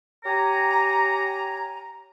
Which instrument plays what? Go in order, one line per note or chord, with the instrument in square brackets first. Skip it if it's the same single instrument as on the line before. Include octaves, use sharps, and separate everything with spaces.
[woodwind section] G4 C#5 G#5 A#5